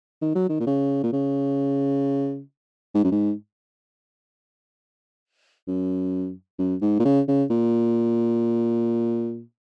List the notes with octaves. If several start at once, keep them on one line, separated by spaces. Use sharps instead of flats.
D#3
F#3
D#3
A#2
C#3
A#2
C#3
G#2
F#2
G#2
F#2
F#2
G#2
A#2
C#3
C#3
A#2